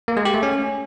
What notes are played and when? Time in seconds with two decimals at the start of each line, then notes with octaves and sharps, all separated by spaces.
0.08 A#3
0.17 G#3
0.25 G4
0.34 A3
0.43 C#4